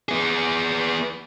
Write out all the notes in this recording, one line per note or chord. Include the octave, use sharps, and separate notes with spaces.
B3 G#4